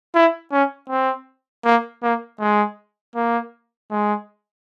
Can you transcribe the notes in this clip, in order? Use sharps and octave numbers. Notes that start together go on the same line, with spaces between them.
E4
C#4
C4
A#3
A#3
G#3
A#3
G#3